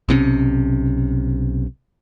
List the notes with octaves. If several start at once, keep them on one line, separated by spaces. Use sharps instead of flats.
B1 C3 C4 C#4